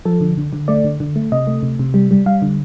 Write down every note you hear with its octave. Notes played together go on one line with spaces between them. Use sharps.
F3 A4
D3
D3
D3
A3 D5
D3
D3
A3
C3 D#5
A3
C3
C3
G3
G3
G3 F5
D3